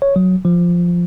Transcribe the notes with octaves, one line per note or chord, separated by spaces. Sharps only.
C#5
F#3
F3